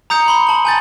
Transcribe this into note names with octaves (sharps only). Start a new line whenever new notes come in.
A#5 D#6 G6 C#7
B5 C6 G7
A5 F#7
G#5 G6 A6